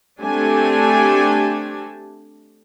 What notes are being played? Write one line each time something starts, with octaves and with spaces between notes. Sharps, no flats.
A3 C4 D4 G4 A4 G#5